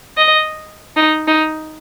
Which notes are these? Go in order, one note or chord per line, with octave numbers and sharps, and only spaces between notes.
D#5
D#4
D#4